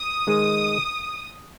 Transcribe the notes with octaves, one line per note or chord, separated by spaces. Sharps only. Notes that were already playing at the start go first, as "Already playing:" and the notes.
Already playing: D#6
D#3 G#3 D#4 G#4 C5